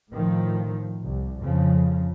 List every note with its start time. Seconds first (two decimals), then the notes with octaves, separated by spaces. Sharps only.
0.12 A2 D#3 F3
1.04 C2
1.42 F2 C#3 F3